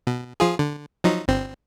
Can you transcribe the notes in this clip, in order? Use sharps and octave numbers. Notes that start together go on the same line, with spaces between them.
B2
F3 F4 G#4
D3
F3 F#3 D#4
G1 C4